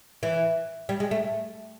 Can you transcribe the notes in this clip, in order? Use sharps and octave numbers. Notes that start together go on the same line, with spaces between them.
E3
G3
G#3
A3